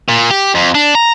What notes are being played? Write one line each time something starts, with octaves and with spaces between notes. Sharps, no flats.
A#2
G4
F2
D4
A#5